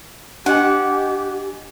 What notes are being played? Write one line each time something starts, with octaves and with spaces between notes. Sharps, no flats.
D4 G4 D#5 F#5 G#5